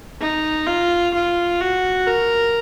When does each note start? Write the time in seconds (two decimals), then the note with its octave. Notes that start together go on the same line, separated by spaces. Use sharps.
0.21 D#4
0.67 F4
1.14 F4
1.61 F#4
2.07 A#4